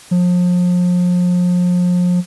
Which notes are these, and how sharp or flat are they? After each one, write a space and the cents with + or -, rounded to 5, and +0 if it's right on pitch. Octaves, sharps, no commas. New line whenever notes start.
F3 +35